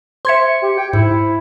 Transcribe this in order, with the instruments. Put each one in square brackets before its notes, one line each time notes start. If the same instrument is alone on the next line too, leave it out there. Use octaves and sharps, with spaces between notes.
[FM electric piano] C5 G#6 C#7 [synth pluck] E5 C6
[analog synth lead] G4
G5
[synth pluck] G#2 [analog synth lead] E4